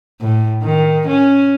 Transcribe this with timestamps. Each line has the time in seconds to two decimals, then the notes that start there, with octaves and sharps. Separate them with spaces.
0.21 A2
0.63 D#3
1.08 C#4